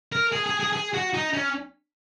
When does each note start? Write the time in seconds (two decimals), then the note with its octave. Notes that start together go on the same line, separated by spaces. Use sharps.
0.12 A#4
0.32 G#4
0.46 G#4
0.60 G#4
0.73 G#4
0.94 F#4
1.13 D#4
1.34 C#4